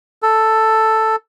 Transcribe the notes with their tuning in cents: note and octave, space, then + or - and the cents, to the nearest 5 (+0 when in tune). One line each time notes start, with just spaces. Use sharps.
A4 +5